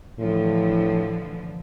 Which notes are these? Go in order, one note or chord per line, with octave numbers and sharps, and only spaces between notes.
A2 D3 E3 F3